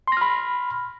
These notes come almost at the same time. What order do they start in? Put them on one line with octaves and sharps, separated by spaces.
C6 A#6 F6 B5